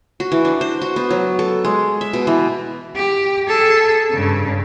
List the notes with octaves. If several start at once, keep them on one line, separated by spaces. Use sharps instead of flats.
F#4
E3
D4
C5
F#4
B3
F#3
A4
G#3
E5
B2
E3
G4
G#4 A4
G2 C#3